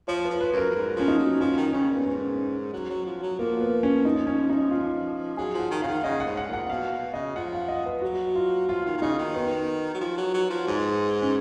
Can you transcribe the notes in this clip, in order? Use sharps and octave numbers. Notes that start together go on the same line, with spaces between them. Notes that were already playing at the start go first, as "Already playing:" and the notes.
F3 C#5
B4
F3
B4
F#2
A#4
F#2
G#2
F3 C#4
D#4
F#3
F3 C#4
D#3
C#3 C#4
A#2
F#2 B3
G#2 C#4
F#3
F#3
F3
F#3
F3 A#3
B3
C#4
D#4
C#4
D#4
F4
F#3 G#4
F3
F#5
D#3
C#3 F5
D#3
C#3 D#5
F#5
G#2
F#5
A#2
F#5
B2 F5
B2
C#3 D#5
F3 F#5
F5
D#5
B4
F#3 F#4
F4
F3 F4
D#3
D#3
C#3 D#4
D#3
B3
F#3
F3
F#3
F#3
F3
G#2
C#4